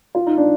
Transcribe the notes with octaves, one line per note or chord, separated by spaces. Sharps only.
F4
D#4
D4